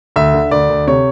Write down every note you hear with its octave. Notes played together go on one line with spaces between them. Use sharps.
D2 E5
D3
D2 D5
D2
C3 C#5